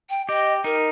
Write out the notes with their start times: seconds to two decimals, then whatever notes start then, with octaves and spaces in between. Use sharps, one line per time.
0.10 G5
0.28 G4 D#5
0.64 D#4 A#4